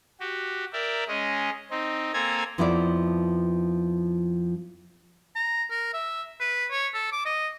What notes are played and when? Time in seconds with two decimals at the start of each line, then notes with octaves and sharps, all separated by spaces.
0.20 F#4 G4
0.73 A#4 D5 E5 G5
1.08 G#3 C#4 D#5
1.70 C4 D#4
2.13 A#3 C4 A4 G#5 A#5 G#6
2.58 F2 F3 B3 E4 G4 D5
5.36 A#5
5.70 A#4
5.94 E5
6.40 B4
6.71 C#5
6.94 A4
7.12 D6
7.25 D#5